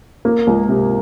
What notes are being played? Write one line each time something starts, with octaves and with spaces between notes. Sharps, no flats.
A#3
C#2
C3